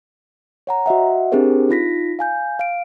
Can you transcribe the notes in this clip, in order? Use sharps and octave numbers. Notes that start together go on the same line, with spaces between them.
C#5 F#5 A#5
F#4 D#5 E5 F#5
C4 D4 G4 G#4 A#4 C5
D#4 F4 A#6 B6
F5 G#5 G6
F5 D7